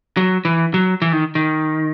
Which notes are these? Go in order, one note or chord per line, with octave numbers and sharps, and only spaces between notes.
F#3
E3
F#3
E3
D#3
D#3